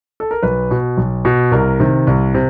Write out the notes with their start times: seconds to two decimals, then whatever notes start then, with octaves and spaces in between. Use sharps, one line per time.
0.20 A4
0.31 A#4
0.43 B1 B4
0.71 B2
0.97 B1
1.25 B2
1.52 C2 A#4
1.80 C3 D#3
2.07 C2
2.35 C3